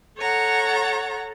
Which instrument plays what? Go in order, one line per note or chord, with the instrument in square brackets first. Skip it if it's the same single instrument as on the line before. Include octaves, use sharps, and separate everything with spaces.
[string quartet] A4 C#5 F#5 A#5